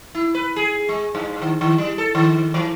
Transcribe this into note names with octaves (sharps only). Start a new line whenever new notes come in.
E4
B4
G#4
G#3
G2
D#3
D#3
G3
A4
D#3
E3